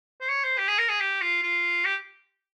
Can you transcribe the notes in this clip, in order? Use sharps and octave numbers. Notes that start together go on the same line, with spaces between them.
C5
C#5
C5
G4
G#4
A#4
G#4
G4
F4
F4
G4